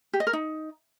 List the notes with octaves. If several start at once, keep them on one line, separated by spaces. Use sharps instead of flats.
G4
D#5
A#4
D#4